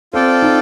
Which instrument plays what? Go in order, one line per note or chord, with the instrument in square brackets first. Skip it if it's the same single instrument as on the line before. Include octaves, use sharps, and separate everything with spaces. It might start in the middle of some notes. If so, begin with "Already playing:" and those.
[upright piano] C4 [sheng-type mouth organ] F4 A4 D5 G5
[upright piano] D#4